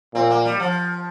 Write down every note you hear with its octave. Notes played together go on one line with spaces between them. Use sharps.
A#2 C4
A#3
G3
F3